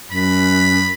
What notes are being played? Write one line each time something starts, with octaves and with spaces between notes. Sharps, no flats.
F#2 B5